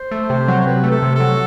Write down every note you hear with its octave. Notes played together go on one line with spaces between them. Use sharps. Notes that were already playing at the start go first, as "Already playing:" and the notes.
Already playing: C5
A3
C3
F#3
C5
C3 B4
A3
A4
C3
A4
F#3